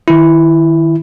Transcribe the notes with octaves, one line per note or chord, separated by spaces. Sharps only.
D#3 E4